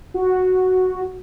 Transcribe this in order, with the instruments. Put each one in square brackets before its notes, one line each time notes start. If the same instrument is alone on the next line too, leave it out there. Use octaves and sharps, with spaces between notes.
[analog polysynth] F#4